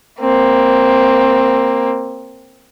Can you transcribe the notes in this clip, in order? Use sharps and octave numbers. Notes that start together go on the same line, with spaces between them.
A#3 C4